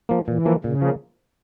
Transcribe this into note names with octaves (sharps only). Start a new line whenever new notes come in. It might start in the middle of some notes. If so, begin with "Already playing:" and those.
F3 A#3
A#2 E3
F3 A#3
A#2 C#3
F3 A#3